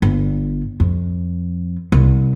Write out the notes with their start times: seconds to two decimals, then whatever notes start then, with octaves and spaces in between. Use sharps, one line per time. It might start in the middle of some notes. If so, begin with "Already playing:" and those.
0.02 G1
0.80 F2
1.92 C2